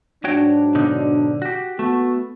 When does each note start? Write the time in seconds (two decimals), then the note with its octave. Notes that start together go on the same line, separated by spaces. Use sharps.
0.24 G#2 F#3 D4 F#4 C#5 G5
0.75 B2 D3 D#4
1.42 F#4 G4
1.79 A3 B3 F#4